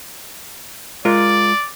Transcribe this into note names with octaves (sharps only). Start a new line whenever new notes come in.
G#3 F4 A#4 D5